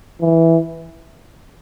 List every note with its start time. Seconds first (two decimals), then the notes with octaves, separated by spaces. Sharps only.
0.21 E3